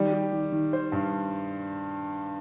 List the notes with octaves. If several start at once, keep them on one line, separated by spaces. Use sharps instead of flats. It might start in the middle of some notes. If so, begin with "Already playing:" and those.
Already playing: D#3 G3
G4
D#3
D#3
C5
G2